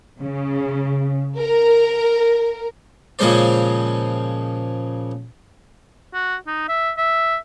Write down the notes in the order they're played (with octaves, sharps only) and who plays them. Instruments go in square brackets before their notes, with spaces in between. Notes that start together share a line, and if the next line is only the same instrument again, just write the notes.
[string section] C#3
A#4
[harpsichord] A#2 C#3 F3 G#3 C5 D5
[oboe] F#4
D#4
E5
E5